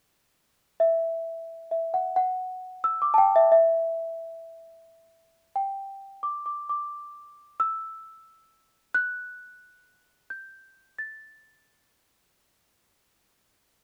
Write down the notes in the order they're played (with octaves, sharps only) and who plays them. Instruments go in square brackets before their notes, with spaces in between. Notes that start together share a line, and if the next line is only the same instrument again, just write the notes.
[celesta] E5
E5
F#5
F#5
E6
D6
A5
G5
E5
E5
G5
D6
D6
D6
E6
F#6
G6
A6